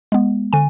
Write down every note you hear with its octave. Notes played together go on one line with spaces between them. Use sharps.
G#3 B3
D3 G#5